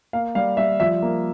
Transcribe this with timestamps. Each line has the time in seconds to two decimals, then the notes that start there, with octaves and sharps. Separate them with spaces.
0.13 A#3 F5
0.35 G3 F5
0.57 G3 E5
0.80 F3 E5
1.02 A#3